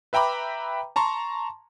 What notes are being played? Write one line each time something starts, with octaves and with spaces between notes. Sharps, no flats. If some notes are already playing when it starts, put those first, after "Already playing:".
B4 E5 G5 A#5 B5 D6
A5 A#5 C6 C#6